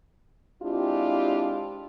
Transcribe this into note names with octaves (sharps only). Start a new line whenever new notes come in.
G#3 C4 D4 E4 F4 G4